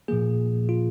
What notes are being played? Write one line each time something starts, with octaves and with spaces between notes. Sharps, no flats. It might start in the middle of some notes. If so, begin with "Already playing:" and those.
A#2 F3 A#3 G#4
F4